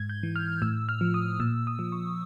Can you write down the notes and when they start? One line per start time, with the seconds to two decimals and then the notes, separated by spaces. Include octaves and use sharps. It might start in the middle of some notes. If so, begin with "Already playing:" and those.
Already playing: G#2 G#6
0.10 G6
0.23 E3
0.36 F6
0.62 A2 E6
0.89 F6
1.01 F3
1.14 D#6
1.40 A#2 E6
1.67 D#6
1.79 F3
1.92 C#6